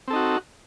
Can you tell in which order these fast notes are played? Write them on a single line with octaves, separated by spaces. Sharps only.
C4 A4 D#4 F#4